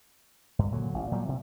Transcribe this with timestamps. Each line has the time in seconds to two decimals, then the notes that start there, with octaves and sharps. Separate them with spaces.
0.59 G2
0.72 A#2 D3 F#3
0.94 A1
1.12 A#2 F#3 G3
1.29 C3